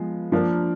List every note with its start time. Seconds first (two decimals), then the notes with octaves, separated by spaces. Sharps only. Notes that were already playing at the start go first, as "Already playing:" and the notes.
Already playing: F3 G#3 B3
0.32 F3 A#3 D4 F4 A#4